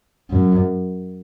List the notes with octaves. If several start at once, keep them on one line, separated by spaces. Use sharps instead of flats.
F#2